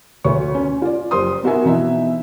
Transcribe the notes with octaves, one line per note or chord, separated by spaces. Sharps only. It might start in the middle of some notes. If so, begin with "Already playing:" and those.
D2 B4 C#5 C#6
C#4
F4 D5
F#1 G4 C5 C6 D#6
B3 D#4 F#4 A#4 E5 G#5
B2 E3 D#4 E5